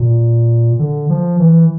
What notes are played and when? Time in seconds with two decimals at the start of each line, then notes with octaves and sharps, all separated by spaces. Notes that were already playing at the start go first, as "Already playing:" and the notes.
Already playing: A#2
0.79 D3
1.10 F3
1.39 E3